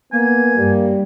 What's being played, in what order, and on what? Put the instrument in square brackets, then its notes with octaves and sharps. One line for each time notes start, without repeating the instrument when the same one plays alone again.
[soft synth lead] A#3 [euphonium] B3 [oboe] G#5
[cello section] G2 [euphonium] G3